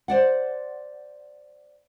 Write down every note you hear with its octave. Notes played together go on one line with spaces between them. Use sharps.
C5 D5 F#5